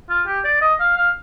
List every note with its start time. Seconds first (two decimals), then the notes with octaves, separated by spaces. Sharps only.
0.10 F4
0.27 G4
0.44 D5
0.61 D#5
0.80 F5
0.97 F5